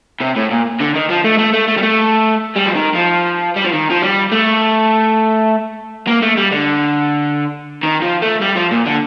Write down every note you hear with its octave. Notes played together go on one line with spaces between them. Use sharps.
C3
A2
A#2
D3
D#3
F3
A3
A3
A3
A3
G3
A3
G3
F3
D#3
F3
G3
F3
D#3
F3
G3
A3
A#3
A3
G3
D3
D#3
F3
A3
G3
F3
A#2
D3